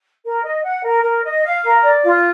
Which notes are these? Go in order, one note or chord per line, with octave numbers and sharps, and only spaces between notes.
A#4
D#5
F#5
A#4
A#4
D#5
F5
A#4
D5
F4